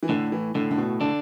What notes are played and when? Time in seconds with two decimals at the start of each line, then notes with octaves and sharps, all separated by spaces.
0.03 E3
0.09 A2 D3
0.32 E3
0.55 A2 D3
0.71 D3
0.78 B2
1.01 D3 D4